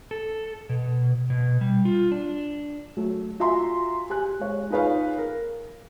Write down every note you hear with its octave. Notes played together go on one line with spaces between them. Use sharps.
A4
B2
B2
G3
F4
D4
F#3 A3
F4 F#4 E5 G#5 A#5 C6
G4 G#5 F#6
G#3 C#5
D#4 F4 G#4 B4 C#5 F5
A#4